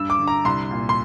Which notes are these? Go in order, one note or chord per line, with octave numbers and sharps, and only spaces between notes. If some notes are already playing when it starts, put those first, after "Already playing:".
Already playing: G2 E6
D6
D3
A#5
C2 C6
A#2
C6